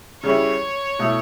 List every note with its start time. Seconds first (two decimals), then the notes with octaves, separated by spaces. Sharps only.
0.23 C#3 G3 C#4 E4 C#5
0.99 B2 A3 E4